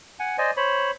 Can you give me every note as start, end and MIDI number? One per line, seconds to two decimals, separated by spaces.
0.20 0.37 78
0.20 0.37 80
0.38 0.51 72
0.38 0.51 74
0.38 0.51 75
0.38 0.51 80
0.57 0.91 72
0.57 0.91 73
0.57 0.91 83